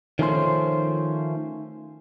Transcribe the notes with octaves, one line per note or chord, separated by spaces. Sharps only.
D#3 F3 A3 C#4 A4 C5